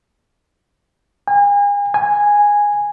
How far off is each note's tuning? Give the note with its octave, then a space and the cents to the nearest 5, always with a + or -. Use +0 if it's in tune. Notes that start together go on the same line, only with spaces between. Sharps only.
G#5 -40
G#5 -10